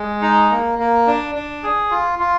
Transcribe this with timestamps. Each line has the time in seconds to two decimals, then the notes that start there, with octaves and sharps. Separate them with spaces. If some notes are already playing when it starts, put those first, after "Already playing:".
Already playing: G#3
0.21 D#4
0.50 A#3
0.79 A#3
1.07 D4
1.35 D4
1.63 G#4
1.91 F4
2.19 F4